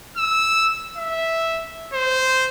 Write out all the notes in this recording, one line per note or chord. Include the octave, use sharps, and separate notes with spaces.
E6
E5
C5